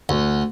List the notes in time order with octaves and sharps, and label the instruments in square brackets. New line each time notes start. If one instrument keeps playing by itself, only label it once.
[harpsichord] D2